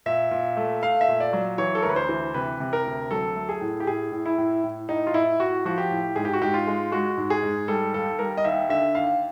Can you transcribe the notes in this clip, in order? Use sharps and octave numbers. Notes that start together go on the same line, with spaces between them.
A#2 E5
A#2
A3
A3 F5
E5
A#2
D5
F#3
E3 C#5
A4
D2 A#4
B4
C5
E3
C3 B4
C3
A#4
D2
F#3 A4
A3
G#4
A2
G4
A2 G#4
A2
E4
A2
A2
A2 D#4
F4
A2 E4
A2 F#4
F3 F#4
G4
A2
G#2 G#4
G4
F#4
G#2 G4
F4
G#3
G#3 F#4
G#2
G#4
G#2
G3 A4
D#2 A4
G3 A#4
D#5
D#2 E5
D3 E5
D#2 F5